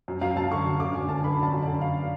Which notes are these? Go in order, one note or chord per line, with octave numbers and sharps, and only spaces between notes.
F#2
F#2 F5
F#2 A5
D3 C#6
F#2
D3 D6
F#2 G#5
D3 A5
D3 B5
D3 A5
F#2
D5
D3
F#2 F5